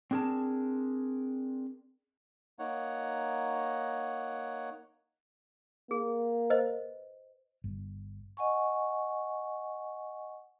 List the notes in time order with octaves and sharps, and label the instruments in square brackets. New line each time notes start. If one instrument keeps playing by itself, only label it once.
[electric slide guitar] C4 D4 G#4 A#4 A5
[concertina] A#3 D#4 C#5 F#5
[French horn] A#3 [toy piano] G#4
[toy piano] B4 C5 D#5
[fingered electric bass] G1
[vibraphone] D#5 F#5 G#5 C#6